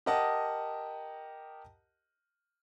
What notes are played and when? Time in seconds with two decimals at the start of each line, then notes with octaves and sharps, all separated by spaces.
0.06 G4 A#4 D#5 F#5 A5 D#6